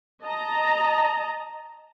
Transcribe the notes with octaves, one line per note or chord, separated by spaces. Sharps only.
D#5 A5 A#5